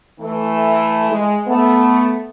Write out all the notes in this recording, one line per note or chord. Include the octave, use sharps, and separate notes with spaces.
E3 A3
G#3
A3 B3